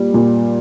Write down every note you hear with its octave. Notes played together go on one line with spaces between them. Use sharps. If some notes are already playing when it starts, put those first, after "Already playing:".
Already playing: A#2 G3
A#2